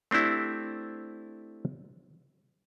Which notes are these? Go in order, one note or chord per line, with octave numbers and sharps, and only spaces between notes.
A3 C4 D4 E4 G4